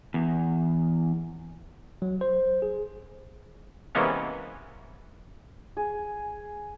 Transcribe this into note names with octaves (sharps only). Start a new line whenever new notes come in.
E2
F#3
C5
G#4
C3 E3 G#3 A#3 B3 C#4
G#4